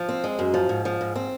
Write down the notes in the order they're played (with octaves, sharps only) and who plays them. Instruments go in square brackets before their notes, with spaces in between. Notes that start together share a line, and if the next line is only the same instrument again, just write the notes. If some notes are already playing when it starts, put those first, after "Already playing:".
Already playing: [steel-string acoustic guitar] F3
C4
G#3
F#2
F3
G#2
F3
G#2
C4